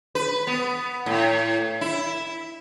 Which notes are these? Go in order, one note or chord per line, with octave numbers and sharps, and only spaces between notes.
B4
B3
A2
E4